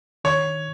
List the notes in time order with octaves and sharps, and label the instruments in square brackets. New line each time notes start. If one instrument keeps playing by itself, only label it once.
[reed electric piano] D#3 [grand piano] C#5